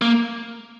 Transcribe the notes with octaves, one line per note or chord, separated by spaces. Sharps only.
A#3